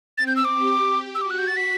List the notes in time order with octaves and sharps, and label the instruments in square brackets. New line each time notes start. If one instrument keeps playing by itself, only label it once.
[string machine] C4 [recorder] A6
[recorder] G6
E6
D6
[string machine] G4
[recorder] E6
[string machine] F#4 [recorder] D6
[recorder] F#6
G6
A6
B6